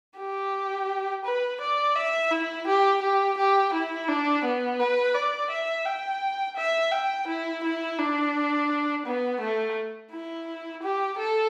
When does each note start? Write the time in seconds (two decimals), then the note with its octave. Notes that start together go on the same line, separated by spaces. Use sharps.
0.18 G4
1.25 B4
1.60 D5
1.96 E5
2.31 E4
2.67 G4
3.02 G4
3.38 G4
3.73 E4
4.08 D4
4.45 B3
4.80 B4
5.15 D5
5.50 E5
5.85 G5
6.57 E5
6.92 G5
7.27 E4
7.64 E4
7.99 D4
9.06 B3
9.41 A3
10.12 E4
10.82 G4
11.18 A4